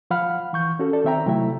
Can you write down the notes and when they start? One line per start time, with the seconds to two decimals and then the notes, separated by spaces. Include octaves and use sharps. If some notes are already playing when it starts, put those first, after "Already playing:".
0.11 F3 F5 F#5 B5 F6
0.53 E3 C#6 G6
0.79 C#4 F#4 A4
0.93 A4 D5
1.04 D#3 C4 E5 G5 A#5
1.26 C3 F#3 A3 E4 E5